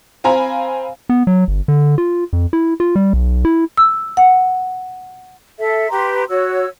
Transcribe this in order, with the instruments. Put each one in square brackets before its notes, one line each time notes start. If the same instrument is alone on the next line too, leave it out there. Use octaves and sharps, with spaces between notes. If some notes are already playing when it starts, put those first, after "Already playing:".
[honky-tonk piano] C4 F5 G#5 A#5 B5
[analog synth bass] B3
F#3
G1
D3
F4
F2
E4
F4
G3
B1
E4
[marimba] E6
F#5
[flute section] A4 E5
G4 B4 A#5 C6
F#4 C#5 E6